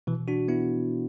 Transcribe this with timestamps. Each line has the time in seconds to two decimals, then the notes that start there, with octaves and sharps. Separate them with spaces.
0.07 B2 E3
0.28 D4 F#4
0.48 B3 E4